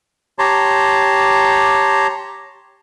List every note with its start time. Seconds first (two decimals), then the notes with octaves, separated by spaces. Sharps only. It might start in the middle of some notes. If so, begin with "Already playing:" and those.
0.39 G4 C#5 A5 A#5 C6